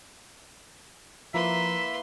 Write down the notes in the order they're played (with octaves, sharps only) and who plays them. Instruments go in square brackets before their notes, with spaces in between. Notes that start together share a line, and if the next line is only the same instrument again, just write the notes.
[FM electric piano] F3 [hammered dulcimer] A#3 E4 [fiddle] B4 C6 [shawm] E5